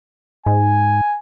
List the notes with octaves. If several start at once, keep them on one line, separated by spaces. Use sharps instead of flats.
G#2 G#5